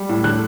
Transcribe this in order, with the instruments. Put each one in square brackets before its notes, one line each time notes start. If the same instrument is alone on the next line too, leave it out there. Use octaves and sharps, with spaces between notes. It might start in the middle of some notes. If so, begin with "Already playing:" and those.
Already playing: [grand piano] G3
A2
D3 F#6